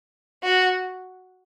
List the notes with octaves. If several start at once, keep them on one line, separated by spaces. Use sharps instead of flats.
F#4